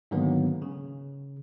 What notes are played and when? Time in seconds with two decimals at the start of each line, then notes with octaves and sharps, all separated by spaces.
0.11 G#2 D3 D#3 F#3 A#3 B3
0.62 C#3